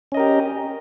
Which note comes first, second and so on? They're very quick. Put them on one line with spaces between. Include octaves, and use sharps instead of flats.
C#4 D#5 A#4 G4